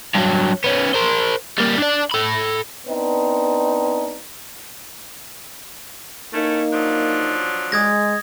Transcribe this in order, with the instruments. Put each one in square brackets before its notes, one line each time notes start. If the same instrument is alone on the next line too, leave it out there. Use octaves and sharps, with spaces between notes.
[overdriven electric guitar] G2 F#3
B3 C#4
A#4 C5
G3 A#3
D4 D5
A4 B5
[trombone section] B3 C4 D4 D#4
[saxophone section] A3 C#4 E4 [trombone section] A#3 D#4
[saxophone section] F3 F#3 D4
[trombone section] G#3 [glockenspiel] D#6 G#6 A#6